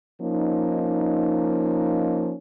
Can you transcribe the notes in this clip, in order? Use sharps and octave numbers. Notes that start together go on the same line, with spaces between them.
F3 A#3 C#4 D#4